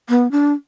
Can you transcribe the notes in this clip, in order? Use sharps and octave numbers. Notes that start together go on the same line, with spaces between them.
B3
D4